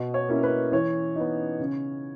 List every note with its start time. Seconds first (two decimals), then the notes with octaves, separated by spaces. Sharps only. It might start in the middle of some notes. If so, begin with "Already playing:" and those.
Already playing: B2 D#5
0.14 C#5
0.29 A#3 C#4 E4
0.43 B4
0.72 E3 C#5
1.16 B3 D#4
1.59 C#3